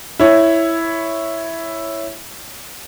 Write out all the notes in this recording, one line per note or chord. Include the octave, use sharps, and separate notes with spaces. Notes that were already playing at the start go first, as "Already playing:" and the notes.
E4 C#5